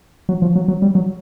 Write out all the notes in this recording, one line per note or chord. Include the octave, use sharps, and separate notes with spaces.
F#3
F3
F#3
F#3
G3
F#3